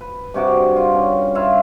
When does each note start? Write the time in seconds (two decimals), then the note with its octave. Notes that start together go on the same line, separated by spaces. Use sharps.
0.01 B4
0.34 G2 C3 F#4 D6
0.76 F4
0.95 C#4
1.35 E4 F4 E5 F5